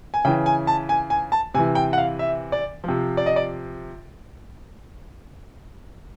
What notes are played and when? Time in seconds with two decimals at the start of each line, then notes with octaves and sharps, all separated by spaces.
0.14 G#5
0.25 C#3 E3 G5
0.46 G#5
0.67 A5
0.89 G#5
1.10 G#5
1.32 A5
1.54 C3 G#5
1.58 E3
1.75 G5
1.93 F#5
1.98 F5
2.19 E5
2.52 D5
2.84 C3 F3
3.17 D5
3.26 D#5
3.36 D5